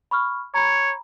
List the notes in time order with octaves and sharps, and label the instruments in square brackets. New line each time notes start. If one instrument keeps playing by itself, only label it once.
[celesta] B5 C#6 F6
[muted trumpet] C#5 [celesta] A#5 B5